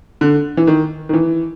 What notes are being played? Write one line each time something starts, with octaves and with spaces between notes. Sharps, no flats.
D3
E3
D#3
D#3
E3